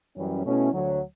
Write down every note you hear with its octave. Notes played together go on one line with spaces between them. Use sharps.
F#2 E3 G3 C#4
B2 A3 C#4 E4
D2 D3 F#3